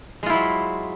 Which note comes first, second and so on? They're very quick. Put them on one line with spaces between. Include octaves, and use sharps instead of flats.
G#3 F4 E4 F#3